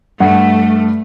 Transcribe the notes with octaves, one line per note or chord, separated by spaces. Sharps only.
G2 A3 F#5